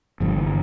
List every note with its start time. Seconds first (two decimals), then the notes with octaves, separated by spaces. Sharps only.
0.20 G1 G2 D3 F3
0.37 E3